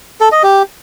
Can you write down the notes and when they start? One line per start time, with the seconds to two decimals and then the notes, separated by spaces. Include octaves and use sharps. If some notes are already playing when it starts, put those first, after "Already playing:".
0.21 A4
0.32 D#5
0.43 G4